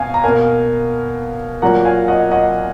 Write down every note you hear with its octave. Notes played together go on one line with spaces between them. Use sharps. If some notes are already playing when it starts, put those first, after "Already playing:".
Already playing: B2 F5 G#5
A#5
B2 A#3 F5 G#5
A#2 F#3 A#3 F#5 A#5
F5 G#5
D#5 F#5
D#5 F#5